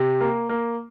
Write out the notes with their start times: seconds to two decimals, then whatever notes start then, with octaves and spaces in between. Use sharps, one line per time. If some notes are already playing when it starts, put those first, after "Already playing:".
Already playing: C3
0.20 A#3
0.49 A#3